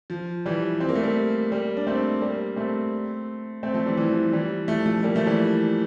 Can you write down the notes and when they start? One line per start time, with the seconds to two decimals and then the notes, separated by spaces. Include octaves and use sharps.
0.10 F3
0.46 E3 G3
0.80 C4
0.89 A#3
0.95 A3
1.03 G3 A#3
1.51 G3 A#3
1.77 D4
1.87 A3 C4
2.22 G3 A#3
2.56 A3 C4
3.63 A3 C4
3.74 F3 A3
3.86 E3 G3
3.97 E3 G3
4.10 F3
4.33 E3 G3
4.68 F3 A3
4.86 F3 A3
5.03 G3 A#3
5.15 F3 A3
5.26 E3 G3